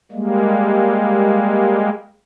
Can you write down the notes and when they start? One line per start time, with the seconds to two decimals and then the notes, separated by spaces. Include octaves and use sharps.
0.12 G3 G#3 A#3